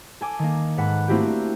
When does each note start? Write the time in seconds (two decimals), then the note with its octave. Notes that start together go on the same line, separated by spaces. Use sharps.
0.21 A4 G#5 D6
0.39 D#3 A#3
0.77 G#2 A4 B4 F#5
1.08 A3 A#3 C4 E4 F#4 G4
1.27 D4